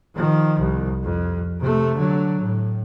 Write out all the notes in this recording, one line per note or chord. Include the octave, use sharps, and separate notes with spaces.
D#3 F3
C2
F2
C3 A3
D3 F#3
A2